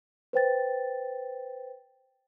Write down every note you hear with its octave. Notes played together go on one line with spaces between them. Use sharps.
B4 C5 G5 A6